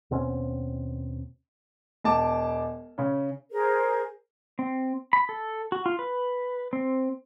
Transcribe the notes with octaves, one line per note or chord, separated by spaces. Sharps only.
D#2 B2 C4 C#4
E1 A5 D6
C#3 C#4
G#4 A#4 C5
C4
B5
A4
F#4
F4
B4
C4